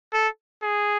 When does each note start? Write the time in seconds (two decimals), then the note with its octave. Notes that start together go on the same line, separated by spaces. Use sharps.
0.13 A4
0.63 G#4